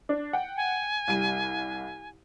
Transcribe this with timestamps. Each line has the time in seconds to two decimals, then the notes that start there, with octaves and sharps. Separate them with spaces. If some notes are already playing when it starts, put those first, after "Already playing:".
0.09 D4
0.33 F#5 G5
0.57 G#5
1.08 C2 G3 D#7